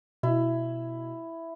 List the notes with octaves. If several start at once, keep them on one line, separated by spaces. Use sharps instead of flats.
B2 E4